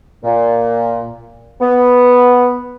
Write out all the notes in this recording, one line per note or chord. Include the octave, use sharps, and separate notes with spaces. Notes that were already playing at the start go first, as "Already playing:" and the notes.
A#2
B3